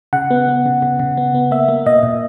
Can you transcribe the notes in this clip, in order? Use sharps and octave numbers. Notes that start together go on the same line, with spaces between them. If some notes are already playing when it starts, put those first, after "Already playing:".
C#3 F#5
B3
B3
C#3
C#3
C#3
B3
B3
A#3 E5
A#3
A#2 D#5
A#2